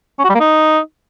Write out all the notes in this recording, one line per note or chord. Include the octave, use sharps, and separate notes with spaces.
C#4
F#4
G3
A#3
D#4